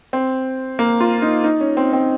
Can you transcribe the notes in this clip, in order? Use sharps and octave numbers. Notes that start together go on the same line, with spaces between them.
C4
A#3
F4
D#4
D#4
C#4
C4
C4